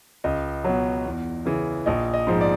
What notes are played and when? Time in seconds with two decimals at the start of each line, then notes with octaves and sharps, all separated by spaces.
0.24 C#2 D#5
0.64 B2 F#3
1.06 E2
1.45 C#3 E3
1.86 A#1 D#5
2.14 D#5
2.27 G#2 F3
2.41 D5